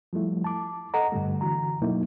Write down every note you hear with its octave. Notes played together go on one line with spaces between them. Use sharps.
F3 G3 A3 E4
A5 D6
A4 D#5 F#5 A#5
G2 D3 G3 A3
D3 E3 F#4 A#5
B2 F#3 A3 A#3 D#4 E4